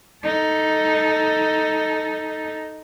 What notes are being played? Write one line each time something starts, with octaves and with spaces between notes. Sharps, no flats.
D#4 A4